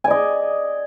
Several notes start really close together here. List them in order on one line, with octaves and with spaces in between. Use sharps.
G#5 D5 D#5